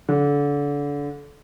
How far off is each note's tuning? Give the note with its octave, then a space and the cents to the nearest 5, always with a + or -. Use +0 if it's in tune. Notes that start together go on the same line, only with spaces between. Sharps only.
D3 -30